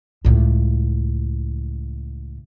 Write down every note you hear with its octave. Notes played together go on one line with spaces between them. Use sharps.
C#2 A2